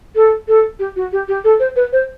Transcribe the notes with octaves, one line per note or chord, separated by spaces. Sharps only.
A4
A4
G4
F#4
G4
G4
A4
C5
B4
C5